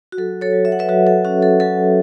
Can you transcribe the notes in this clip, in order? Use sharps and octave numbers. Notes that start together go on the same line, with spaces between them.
F#4
F#3 A4
A4 C#5
F#3
E5
F#5
B4 E5
F#3 F#4
A4
C#4 F#4
A4
F#3 A4